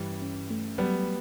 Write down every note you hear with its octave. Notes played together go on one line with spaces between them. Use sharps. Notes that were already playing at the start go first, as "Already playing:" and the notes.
Already playing: G2 E3 G3 C#4
C#4
A3
F#3 G3 B3